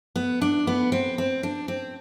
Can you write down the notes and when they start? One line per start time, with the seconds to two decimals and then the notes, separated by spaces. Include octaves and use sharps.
0.16 B3
0.42 D4
0.67 B3
0.92 C4
1.18 C4
1.43 D4
1.68 C4